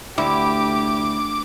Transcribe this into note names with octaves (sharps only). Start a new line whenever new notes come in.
D2 E4 G4 D6